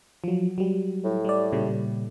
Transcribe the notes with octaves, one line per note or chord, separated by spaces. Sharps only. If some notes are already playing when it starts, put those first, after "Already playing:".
F3 F#3
F#3 G3
A2
G3 D5
A#2 C#3 G3